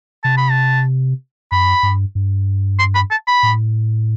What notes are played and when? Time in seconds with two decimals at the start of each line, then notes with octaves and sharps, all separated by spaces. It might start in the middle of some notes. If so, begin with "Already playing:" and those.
0.24 C3 A5
0.37 B5
0.51 A5
1.52 F#2 B5
1.83 G2
2.15 G2
2.79 C6
2.95 B5
3.11 A5
3.27 B5
3.43 A2